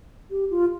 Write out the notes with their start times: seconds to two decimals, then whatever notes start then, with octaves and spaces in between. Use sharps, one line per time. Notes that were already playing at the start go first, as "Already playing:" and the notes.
0.31 G4
0.51 F4